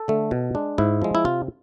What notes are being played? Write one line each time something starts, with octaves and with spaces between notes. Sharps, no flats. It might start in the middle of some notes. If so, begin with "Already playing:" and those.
Already playing: A4
D3 A3
B2
G#3 D4
G#2 E4
F3 G#3
E4
C3 F4